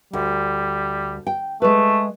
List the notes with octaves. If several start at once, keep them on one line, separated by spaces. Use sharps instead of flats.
D2 G3
G5
G#3 A3 B4